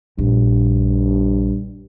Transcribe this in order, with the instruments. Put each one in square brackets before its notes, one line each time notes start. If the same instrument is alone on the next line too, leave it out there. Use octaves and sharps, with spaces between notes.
[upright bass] A#1 [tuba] G2